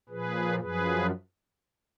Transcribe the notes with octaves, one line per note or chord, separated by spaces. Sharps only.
A#2 F3 G#4 B4
F#2 F3 G#4 B4